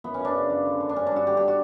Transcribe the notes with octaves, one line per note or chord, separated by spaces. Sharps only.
F#2 B3
C#4
F#2
D4
C#3
F#2
D3
D3
D4
G2 C#4
D4
G2 F#4
D3 G4
G4
F#4